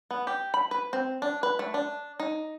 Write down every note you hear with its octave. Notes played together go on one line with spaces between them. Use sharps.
B3
G4
B5
B4
C4
D4
B4
A3
D4
D#4